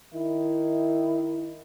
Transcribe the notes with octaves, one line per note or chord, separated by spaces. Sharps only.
D#3 E4